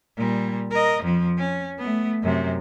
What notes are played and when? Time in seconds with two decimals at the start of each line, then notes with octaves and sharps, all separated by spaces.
0.17 A#2 G3
0.71 A#4 D#5
1.03 F2 F3
1.38 C#4
1.79 A3 B3
2.22 F#2 C3